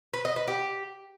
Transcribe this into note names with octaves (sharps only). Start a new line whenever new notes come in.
B4
D#5
B4
G4